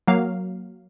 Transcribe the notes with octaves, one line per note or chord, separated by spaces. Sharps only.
F#3 A#3 F5